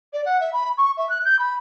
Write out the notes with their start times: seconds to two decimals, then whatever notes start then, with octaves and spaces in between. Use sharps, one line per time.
0.13 D5
0.25 F#5
0.40 E5
0.52 B5
0.77 C#6
0.97 E5
1.09 F#6
1.24 G6
1.38 B5